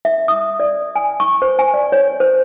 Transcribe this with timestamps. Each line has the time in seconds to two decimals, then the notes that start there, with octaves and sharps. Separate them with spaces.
0.05 E5
0.28 D#6
0.60 D5
0.96 G#5
1.20 C#6
1.42 C5
1.59 G#5
1.74 D5
1.92 C#5
2.20 C5